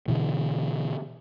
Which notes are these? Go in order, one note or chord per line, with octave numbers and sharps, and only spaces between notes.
B2 D3 E3